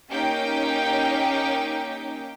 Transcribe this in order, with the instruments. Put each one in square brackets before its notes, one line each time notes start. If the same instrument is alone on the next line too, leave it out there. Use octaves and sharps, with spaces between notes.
[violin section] A#3 C#4 D#4 G4 G5